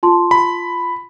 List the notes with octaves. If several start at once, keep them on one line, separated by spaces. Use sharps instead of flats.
F4 A5 C6
B5